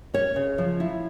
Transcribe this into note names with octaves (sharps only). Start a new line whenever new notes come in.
C#4 C#5
C#3
F3
E4